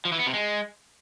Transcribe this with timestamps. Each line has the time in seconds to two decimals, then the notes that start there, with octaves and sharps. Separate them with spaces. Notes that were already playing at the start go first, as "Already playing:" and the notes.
0.05 F3
0.12 E3
0.19 B3
0.26 C3
0.33 G#3